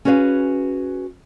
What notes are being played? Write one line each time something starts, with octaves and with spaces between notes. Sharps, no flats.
C#4 F#4 G#4 B4 E5 F5